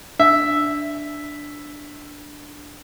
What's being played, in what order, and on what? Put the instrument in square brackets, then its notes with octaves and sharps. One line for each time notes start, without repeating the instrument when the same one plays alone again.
[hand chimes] D4 [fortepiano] E5